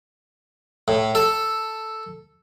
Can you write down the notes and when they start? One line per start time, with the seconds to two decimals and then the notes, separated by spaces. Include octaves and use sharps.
0.88 A2
1.15 A4